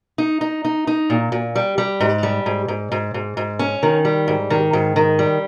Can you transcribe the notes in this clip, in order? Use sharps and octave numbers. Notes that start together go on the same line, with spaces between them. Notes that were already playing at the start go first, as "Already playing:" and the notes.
D#4
D#4
D#4
D#4
A#2
A#2
G3
G3
G#2
G3
G#2
G#2
G#2
G#2
G#2
C#4
D#3
G3
G#2
D#3
G#2
D#3
G3